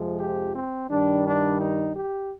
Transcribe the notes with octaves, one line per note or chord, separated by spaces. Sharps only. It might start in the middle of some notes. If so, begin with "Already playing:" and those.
Already playing: F2 C3 F3 G#3
G4
C4
G2 D#3 G3 D4
D4
D#4
G4